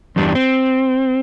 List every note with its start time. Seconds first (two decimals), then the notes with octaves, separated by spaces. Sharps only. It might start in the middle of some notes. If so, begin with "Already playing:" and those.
0.16 E2 G2 G3 D4
0.35 C4